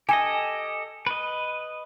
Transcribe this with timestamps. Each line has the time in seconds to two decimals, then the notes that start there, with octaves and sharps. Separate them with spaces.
0.09 G4 A4 D#5 G#5
1.07 B4 D#5